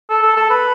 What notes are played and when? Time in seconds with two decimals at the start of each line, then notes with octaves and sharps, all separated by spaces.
0.09 A4
0.23 A4
0.37 A4
0.50 B4